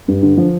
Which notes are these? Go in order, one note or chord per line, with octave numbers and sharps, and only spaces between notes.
G2
D3
F3